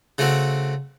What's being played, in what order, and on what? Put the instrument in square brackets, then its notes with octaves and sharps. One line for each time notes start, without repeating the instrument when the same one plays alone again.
[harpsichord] C#3 A3 C4 F#4